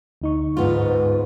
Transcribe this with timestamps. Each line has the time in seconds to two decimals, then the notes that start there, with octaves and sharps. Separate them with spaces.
0.22 D2 D#4 C#6
0.57 G#2 B3 F4